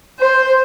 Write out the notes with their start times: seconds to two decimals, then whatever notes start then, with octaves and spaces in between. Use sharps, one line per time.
0.18 C5